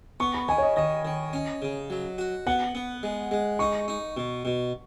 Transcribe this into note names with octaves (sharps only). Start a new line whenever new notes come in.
B3 C#6
B5
D#3 G#5
C#5
D#5
D#3 D#5
D#3
C#4
C#3
F#3
F#4
B3 F#5
B3
G#3
G#3
D#4 C#6
D#4
B2
B2